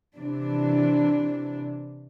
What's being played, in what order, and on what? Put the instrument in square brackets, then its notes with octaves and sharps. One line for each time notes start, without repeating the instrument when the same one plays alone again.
[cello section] C3 E3 D4